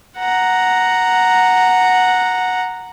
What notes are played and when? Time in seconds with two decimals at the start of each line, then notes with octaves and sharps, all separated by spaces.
0.18 F#5 A#5